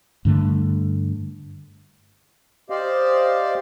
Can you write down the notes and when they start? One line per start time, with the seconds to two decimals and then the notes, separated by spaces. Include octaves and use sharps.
0.25 G2 D3 A3
2.70 G4 C5 D5 D#5 F5